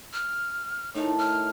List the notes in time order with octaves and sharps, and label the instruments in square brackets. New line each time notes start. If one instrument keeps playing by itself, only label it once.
[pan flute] F6
[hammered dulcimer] A2 D#3 A5 [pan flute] D#4
[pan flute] F6